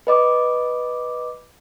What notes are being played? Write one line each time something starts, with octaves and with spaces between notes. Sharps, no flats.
B4 D#5 D6